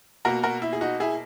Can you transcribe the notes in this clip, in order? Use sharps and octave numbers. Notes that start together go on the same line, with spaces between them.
B2 A#3 F#4 A#4
F#4 A#4
E4
G#4
D#4 F#4
E4 G#4